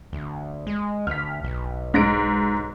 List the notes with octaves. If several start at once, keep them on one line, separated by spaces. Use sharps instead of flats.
D2
G#3
D2 F6 B6
B1
G#2 A#6 D7